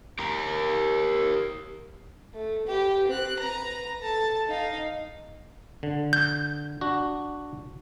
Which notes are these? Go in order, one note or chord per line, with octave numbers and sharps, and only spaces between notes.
G4 A#4
A3
G4 B4
C4 F#6
B4 A#5
A4 A5
D#4 F5
D3
G6
D4 F#4